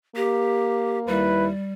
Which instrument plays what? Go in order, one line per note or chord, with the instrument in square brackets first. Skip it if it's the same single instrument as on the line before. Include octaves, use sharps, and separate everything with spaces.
[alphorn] A#3 [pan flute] G4
[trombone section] D#2 E4 B4 [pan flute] G3